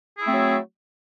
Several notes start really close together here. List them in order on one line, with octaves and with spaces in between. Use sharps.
G#4 E4 A3 C4 F#3